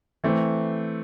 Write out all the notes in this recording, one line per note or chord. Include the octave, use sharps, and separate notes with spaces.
E3 A3 C4